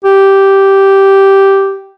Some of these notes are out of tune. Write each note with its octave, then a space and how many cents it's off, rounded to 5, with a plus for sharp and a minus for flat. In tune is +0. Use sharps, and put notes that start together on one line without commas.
G4 -5